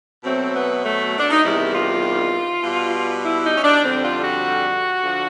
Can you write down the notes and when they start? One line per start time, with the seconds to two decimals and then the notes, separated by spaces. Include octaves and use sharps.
0.24 B2 F#3 A3 C4
0.54 B3
0.83 A3
1.18 D4
1.31 D#4
1.43 E2 C3 D#3 G3 E4
1.73 F4
2.64 B2 G3
3.23 E4
3.43 D#4
3.56 C#4
3.63 D4
3.83 F2 D3 G3 C4
4.03 F4
4.23 F#4
5.03 D3 F3